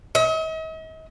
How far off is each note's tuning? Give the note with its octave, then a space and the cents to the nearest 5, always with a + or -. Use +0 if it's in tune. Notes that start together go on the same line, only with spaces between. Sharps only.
D#5 +45